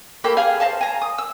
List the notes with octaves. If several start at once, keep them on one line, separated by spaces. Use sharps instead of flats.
A#3 G4 A4 B5
G#4 F5 G#5
C5 D#5 F5 A5
G#5 A#5
D#6
E6